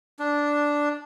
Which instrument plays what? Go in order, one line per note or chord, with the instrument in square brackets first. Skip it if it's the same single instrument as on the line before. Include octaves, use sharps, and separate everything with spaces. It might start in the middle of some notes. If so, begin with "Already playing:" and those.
[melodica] D4